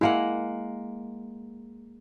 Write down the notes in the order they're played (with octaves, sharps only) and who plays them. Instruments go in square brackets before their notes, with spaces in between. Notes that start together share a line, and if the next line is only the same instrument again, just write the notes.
[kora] G#3 A#3 F#5 [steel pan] E4